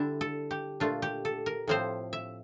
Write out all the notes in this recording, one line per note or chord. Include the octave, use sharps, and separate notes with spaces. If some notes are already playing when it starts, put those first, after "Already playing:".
Already playing: D3 G3 D4 E4
A4
G4
A#2 A3 D4 F4
G4
A4
A#4
A2 F3 C4 C5
E5